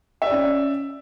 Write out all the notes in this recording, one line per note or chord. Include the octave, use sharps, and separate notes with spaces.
C#4 D5 E5